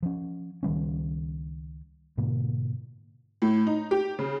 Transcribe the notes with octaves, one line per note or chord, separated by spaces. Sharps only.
F3 C#4
C#2 D#3 G3 C#4
G#2 B2 D3 A#3
A2
D#4
G4
C#3